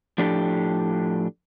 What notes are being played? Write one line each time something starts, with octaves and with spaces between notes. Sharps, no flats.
A2 F3 D4 G4 A4